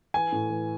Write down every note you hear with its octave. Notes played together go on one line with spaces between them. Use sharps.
E3 G#5
A2
E3